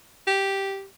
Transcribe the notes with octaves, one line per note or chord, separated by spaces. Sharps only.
G4